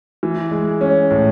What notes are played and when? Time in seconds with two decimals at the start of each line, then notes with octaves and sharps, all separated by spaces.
0.23 E3
0.51 G#3
0.81 C#4
1.11 A2